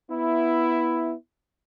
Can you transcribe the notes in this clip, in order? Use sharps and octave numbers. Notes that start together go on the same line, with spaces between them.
B3 E4